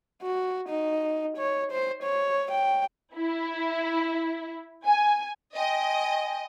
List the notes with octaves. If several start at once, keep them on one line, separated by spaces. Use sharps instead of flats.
F#4
D#4
C#5
C5
C#5
G5
E4
G#5
D#5 G5 G#5 C6